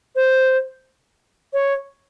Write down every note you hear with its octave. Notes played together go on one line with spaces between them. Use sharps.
C5
C#5